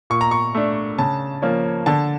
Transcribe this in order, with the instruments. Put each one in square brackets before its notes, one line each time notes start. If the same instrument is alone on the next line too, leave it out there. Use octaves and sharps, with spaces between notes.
[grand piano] A#2 C#6
A#5
C#6
A3 D4
C#3 A5
F3 A#3 C#4
D3 A5